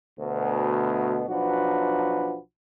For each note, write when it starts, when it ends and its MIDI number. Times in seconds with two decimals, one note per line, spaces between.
0.19 1.24 38
0.19 1.24 47
1.28 2.37 35
1.28 2.37 53
1.28 2.37 62
1.28 2.37 66
1.28 2.37 71